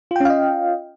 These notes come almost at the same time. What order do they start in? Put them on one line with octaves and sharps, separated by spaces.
F4 G5 C#4 F5 D#5